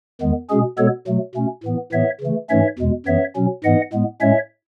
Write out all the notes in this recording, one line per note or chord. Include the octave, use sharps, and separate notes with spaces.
E2 D#3 G#3 B3
B2 G#3 C#4 G#4
B2 G#3 B3 A4 C#5
B2 F#3 A3
B2 A3 C#4
A2 E3 B3
A2 E3 B3 C#5 E5
C#3 E3 A3
G#2 E3 A3 C#4 C#5 E5
E2 B2 G#3
F#2 E3 B3 C#5 E5
B2 F#3 C#4
G#2 E3 B3 D#5 F#5
A2 G#3 B3
A2 G#3 C#4 C#5 E5